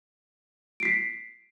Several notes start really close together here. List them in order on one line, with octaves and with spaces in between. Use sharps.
D7 C7 B6